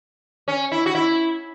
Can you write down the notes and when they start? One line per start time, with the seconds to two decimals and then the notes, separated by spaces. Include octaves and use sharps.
0.48 C#4
0.72 E4
0.86 F#4
0.95 E4